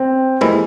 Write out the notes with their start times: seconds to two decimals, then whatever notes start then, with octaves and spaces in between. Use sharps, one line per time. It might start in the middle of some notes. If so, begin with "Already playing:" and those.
Already playing: C4
0.41 F2 C3 E3 G#3 A#3 E4